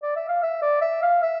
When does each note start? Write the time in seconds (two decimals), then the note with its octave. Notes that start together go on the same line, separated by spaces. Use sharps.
0.03 D5
0.16 E5
0.28 F5
0.43 E5
0.62 D5
0.81 E5
1.03 F5
1.22 E5